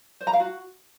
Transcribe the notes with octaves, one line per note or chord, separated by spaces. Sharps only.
C5
A#5
F5
F#4